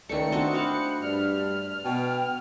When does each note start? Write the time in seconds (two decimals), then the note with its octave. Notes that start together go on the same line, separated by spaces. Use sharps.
0.09 C#2 D#3 A3 D5 C#7
0.32 C4 D4 F#4 D#5
0.53 F#4 C5 F5 B5
1.02 G2 D5 F6
1.84 B2 G5